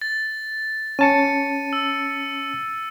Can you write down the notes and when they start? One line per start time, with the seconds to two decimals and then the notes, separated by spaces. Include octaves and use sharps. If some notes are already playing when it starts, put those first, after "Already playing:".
0.02 A6
0.99 C#4 A5 C#7 D#7
1.73 E6